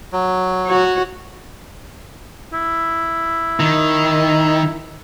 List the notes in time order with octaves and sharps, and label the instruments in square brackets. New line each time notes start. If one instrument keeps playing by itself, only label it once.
[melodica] F#3
[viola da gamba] F#4 C#5
[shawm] E4
[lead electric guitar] D#3